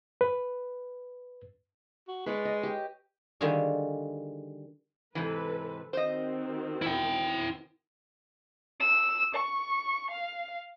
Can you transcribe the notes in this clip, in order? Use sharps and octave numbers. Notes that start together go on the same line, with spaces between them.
B4
F#4
G#3 B4 C#5 D5
D#5
G4
D3 D#3 G3 F4 F#4 G#4
G#2 C3 E3 A4 B4
D#3 C4 F#4 C5 D#5
E2 E4 G5
E6
C#6
F5